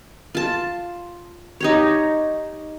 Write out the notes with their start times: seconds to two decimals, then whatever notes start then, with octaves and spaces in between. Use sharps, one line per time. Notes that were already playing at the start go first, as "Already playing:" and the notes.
0.35 F4 A5
1.60 D#4 G4 C#5